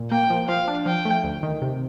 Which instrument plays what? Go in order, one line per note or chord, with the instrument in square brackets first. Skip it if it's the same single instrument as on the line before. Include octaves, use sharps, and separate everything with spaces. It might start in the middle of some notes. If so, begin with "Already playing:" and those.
Already playing: [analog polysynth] A#2
[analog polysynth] A#3 [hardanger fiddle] G5
[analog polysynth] F3
[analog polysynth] F3 [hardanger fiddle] F5
[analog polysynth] D4
[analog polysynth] F3 [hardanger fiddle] G5
[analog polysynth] A3
D2
D#3
C3